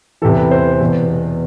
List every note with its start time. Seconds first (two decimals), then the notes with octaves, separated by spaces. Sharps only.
0.22 E3 A4
0.25 E2 C3
0.37 B4
0.51 C5
0.81 E2 B2